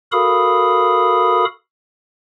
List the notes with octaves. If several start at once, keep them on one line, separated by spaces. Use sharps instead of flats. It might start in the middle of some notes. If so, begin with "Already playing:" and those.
F#4 A4 A#4 F5 B5 D#6